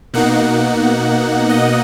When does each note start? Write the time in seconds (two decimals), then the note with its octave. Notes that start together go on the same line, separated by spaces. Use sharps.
0.14 B2 A#3 D#4 F#5
1.49 D#5